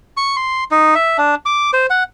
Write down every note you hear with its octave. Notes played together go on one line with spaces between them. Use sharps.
C#6
C6
D#4
E5
D4
D6
C5
F#5